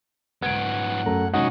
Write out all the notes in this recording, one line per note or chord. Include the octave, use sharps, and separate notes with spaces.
G#2 B3 F#5 G#6 D7
F#2 A3 A#5
G#2 C3 C#4 D#4 F#4 F#5